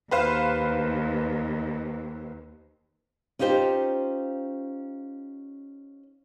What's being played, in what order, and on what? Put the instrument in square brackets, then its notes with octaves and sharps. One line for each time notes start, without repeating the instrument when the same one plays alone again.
[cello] D#2 [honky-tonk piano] B4 C5 F5
[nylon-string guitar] C#4 D#4 F4 G4 C5